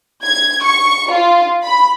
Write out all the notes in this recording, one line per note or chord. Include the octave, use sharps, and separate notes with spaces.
G#6
C#6
F4
B5